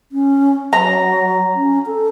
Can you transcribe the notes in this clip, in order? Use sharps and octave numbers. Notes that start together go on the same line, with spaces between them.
C#4
F#3 A#5
C#4
A4